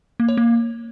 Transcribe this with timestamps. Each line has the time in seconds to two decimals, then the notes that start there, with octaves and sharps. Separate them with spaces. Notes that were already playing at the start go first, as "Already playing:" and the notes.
0.20 A#3
0.29 C#5
0.37 A#3